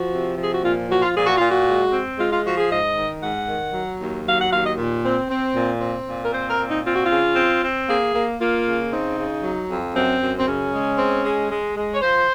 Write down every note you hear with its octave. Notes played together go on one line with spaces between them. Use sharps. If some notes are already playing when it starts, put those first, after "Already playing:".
Already playing: F3 F#4
C3
F3 G#4
F#4
A#2 F4
F3 F#4
F4
A#2 G#4
F#4
A#2 F4
F#4
G#3
C4
G#3 F4
F4
F3 F#4
G#4
G#2 D#5
D#3
G#2 F#5
D#3
F#3
D#2
F#3 F5
F#5
D#2 F5
D#5
A#2
C4
C4
A#2
C4
A#2
A#4
C4 C5
A#4
A#2
D#4
C4 F4
F#4
F4
C#3
C4
C4
A#3 G#4
A#3
A#3 F4
C#3
C4 D#4
C#3
F#3
F2
F#2 C4
F#2
C4
C#3 C#4
G#3
C4
G#3
G#3
G#3
C#5
F3 C5